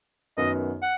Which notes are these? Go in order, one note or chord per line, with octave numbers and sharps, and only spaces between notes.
F#2 D#3 B3 D#4 F#4 D#5
F#5